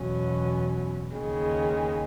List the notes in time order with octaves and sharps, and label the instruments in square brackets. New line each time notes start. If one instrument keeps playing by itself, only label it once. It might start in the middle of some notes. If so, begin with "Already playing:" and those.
Already playing: [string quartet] E2 B2 F#3 C#4
D#2 C#3 G#3